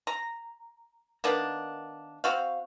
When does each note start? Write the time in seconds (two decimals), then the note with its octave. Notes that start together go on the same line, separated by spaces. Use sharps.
0.07 A#5
1.24 D#3 A#3 B3 D4
2.24 C4 F#4 F5